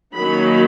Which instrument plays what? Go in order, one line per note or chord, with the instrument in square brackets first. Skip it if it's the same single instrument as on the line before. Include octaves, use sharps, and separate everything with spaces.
[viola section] D#3 F#3 A#3 C#4 B5